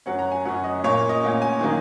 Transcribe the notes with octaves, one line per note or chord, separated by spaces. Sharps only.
F#2 F#3 C#4 F#5
A#5
G#5
F#2 F#3 C#4 F#5
D#5
A#2 A#3 C#4 C#5
D#5
A#2 A#3 C#4
G#5
D#3 F#3 A#3